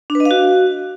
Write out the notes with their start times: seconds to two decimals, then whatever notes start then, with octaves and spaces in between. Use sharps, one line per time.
0.10 D4
0.15 B4
0.20 D#5
0.25 F5
0.31 F#4